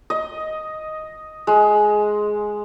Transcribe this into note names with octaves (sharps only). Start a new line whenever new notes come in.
D#5
G#3